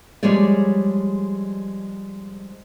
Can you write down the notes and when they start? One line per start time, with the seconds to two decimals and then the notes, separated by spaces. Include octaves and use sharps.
0.23 F3 G3 G#3 G#4 C#5 D5